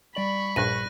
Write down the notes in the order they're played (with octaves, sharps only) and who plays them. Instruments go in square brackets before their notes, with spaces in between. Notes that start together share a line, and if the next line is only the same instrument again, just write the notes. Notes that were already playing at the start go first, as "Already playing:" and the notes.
[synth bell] G3 D5 F#7 [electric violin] B5 C#6
[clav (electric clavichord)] A#1 G2 [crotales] F#6 A#6 D#7